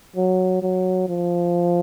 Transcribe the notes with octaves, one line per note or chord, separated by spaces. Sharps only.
F#3
F#3
F3